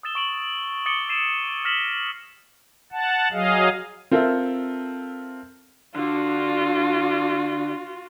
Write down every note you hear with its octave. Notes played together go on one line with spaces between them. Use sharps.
D#6 E6 A6 E7 G7
C#6 D7 F#7
D6 D#6 A6 C#7 D7 G7
E6 G#6 C7 D#7 E7
F6 A#6 B6 E7 F#7 G7
F#5 A5
F#3 G#4 D#5 F5
C4 F4 A4 A#4 E5
D3 F4 F#4